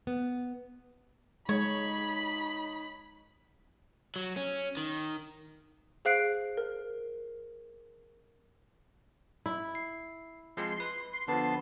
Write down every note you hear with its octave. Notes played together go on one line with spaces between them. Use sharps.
B3
G#3 D#4 C#5 B5
F#3
C#4
D#3
G#4 C5 F5 F#6 C7 D7
A#4
E4
C7
F3 G#3 C4 C6
B4
C6
D3 F3 B3 A5